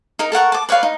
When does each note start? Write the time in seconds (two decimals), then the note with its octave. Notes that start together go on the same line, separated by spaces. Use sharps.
0.19 D#4 A#4
0.32 A4 A#4 F#5 C#6
0.52 A5 D6
0.69 B4 C#5 D5 F5
0.83 D#4